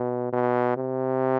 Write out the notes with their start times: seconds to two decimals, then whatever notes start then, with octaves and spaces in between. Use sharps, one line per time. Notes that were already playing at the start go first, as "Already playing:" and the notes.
Already playing: B2
0.33 B2
0.77 C3